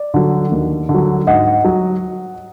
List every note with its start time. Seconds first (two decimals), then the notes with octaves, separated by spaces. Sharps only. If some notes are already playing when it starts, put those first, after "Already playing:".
Already playing: D5
0.14 D3 F#3
0.52 D#2
0.89 D3
0.94 F#3
1.27 G#2 D#5 F#5
1.65 F#3